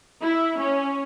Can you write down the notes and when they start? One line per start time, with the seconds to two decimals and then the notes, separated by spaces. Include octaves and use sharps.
0.21 E4
0.59 C#4